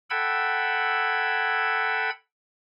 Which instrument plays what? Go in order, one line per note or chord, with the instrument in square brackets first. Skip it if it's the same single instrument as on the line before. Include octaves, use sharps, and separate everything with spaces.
[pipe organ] A4 F#5 G5 B5 E6 G#6